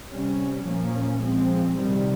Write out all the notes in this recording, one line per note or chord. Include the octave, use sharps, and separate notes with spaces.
C3 G3 C#4
A#2 F3 A#3 C#4
F3 G#3 C4
C3 D#3 G3